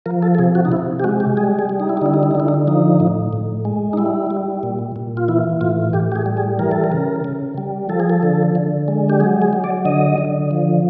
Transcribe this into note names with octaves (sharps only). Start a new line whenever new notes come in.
F3 A#4
A4
A4
C3 G#4
F#4
D#4
C3 E4
G4
G#3 F#4
G4
G3 G#4
G#4
G3
D#4
E4
D#4
D3 E4
D#4
E4
D#4
D3 E4
D#4
F3 D#4
A2
A2
G#3
D#4
G3 E4
G3
A#2
A#2
F4
E3 E4
A2 F4
A2 G4
G4
G#4
G3
G#4
E3 A#4
A4
A#4
C#3
C#3
G3
F3 A4
G#4
A4
D3
D3
G#3
G4
F#3 G#4
G#4
F#3
D5
D3 D#5
D3
F3